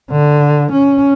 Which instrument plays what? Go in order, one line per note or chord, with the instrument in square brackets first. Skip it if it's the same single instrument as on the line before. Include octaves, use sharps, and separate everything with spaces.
[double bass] D3
C#4